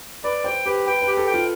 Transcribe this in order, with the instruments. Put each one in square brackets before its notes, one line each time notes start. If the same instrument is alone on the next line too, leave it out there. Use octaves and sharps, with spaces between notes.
[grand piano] B4 [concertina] D5
[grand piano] C5 [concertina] G5
[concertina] G4 [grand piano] B4
[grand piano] B4 [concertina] G5
[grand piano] B4
[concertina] G4
[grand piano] A4
[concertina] G5
[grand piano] F4